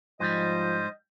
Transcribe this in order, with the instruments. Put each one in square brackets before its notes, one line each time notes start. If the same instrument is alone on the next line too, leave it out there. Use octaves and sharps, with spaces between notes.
[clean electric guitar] G#2 G3 [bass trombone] F3 [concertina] C5 [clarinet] D#5